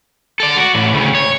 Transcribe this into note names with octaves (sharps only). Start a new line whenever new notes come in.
A4 D5
F#4
A2 E3
D2 C#3
C#5